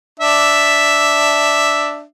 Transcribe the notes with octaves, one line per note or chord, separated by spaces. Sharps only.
D4 E5